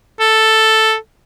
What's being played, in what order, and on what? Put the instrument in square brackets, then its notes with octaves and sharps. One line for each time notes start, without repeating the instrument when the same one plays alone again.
[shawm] A4